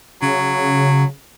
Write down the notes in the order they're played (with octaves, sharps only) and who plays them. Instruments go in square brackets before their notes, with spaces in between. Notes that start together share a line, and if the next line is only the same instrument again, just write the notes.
[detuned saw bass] C#3 [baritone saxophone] F#3